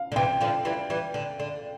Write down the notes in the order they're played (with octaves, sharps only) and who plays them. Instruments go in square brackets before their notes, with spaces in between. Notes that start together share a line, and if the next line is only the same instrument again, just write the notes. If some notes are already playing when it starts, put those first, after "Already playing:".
Already playing: [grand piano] F5
[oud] D3
[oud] C3 E3 [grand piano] G5
[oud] D3 F3
E3 G3
E3 G3
D3
D3